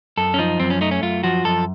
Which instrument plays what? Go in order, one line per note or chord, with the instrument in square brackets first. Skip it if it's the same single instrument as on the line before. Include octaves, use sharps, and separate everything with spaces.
[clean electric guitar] F#2 A4
C#4
F3 D#4
F#2 C4
C#4
A3 D#4
C#4
F#2 F4
F3 F#4
F#2 A4